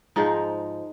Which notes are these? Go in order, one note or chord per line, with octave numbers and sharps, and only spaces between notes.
G#2 F3 G#3 D#4